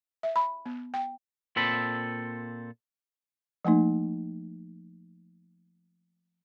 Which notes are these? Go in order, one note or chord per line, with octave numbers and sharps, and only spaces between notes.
E5
B5
B3
G5
A#2 C4 A4 B5
F3 A3 A#3 D#4